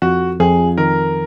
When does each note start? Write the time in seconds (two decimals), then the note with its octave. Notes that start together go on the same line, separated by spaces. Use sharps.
0.02 F2 F#4
0.40 F2 G#4
0.78 D#3 A#4